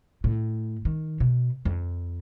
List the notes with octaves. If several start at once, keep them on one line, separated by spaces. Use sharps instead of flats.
A2
D#3
B2
F2